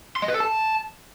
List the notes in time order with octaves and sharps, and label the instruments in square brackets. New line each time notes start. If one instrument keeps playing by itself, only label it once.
[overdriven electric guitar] C6
D#5
B4
A4
A5